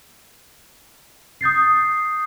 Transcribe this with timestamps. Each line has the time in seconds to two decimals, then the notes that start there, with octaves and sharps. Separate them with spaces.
1.41 D#6 G6 A6 C7